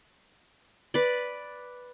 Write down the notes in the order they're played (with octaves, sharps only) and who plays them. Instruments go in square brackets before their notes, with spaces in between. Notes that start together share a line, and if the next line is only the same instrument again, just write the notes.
[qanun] B4 D5